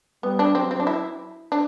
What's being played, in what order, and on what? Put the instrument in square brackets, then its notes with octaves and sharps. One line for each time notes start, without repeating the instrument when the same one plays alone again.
[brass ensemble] G3 [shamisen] B3
[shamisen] D4
[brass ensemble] F#3 [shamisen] C4
[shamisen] C4
D4
E4
D4